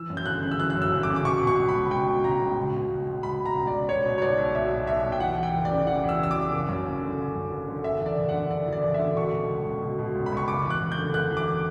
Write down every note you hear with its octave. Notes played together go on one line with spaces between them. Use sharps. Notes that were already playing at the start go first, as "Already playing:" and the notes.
Already playing: E3 E6
F#2
G6
G1 F#6
C#3
E6
E3 F#6
F#6
F#2
E6
G1
D6
C#3
D6
B2 C#6
B2
C#6
C#2
B5
C#2
B2 G5
B2
C#2 A#5
C#2
B2
B2
C#2
C#2
B2 B5
B2
A#5
C#2
D5
C#2
B2 C#5
B2
C#5
B1 D5
B1
B2 E5
B2
B1 E5
B1
G5
E3 F#5
E2
G5
F#1
C#3 D5
E3 F#5
E2
E6
F#1 E6
C#3 D6
F#1
F#2
F#1
D3
F#1
F#2
F#1
D3
F#1 E5
E2 D5
F#1
F#5
D3
F#1 D5
E2
D5
F#1
E5
D3
B2 C#6
B2
C#2
C#2
B2
B2
C#2
B5
C#2 C#6
F#1 D6
E2
F#6
F#1
G6
D3
F#1 F#6
E2
D6